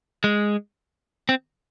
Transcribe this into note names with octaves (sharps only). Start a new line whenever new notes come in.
G#3
C4